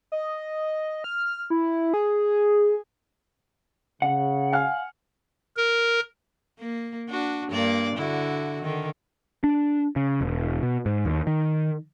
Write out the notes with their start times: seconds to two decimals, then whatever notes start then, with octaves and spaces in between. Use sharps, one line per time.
0.12 D#5
1.04 F6
1.50 E4
1.94 G#4
4.02 C#3 F#5
4.53 F5 G#5 F6
5.57 A#4
6.59 A#3
7.10 D4 F#4
7.50 G2 A#3 D5
7.96 D3 E4 F#4
8.62 D3 D#3
9.44 D4
9.96 C#3
10.21 E1
10.63 B2
10.86 G#2
11.05 D#2
11.27 D#3